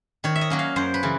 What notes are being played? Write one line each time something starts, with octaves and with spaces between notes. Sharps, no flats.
D#3 C#5
E5
D#5
F#3 A#3 C#4
F5
F#2 C5
B4
C#3 E3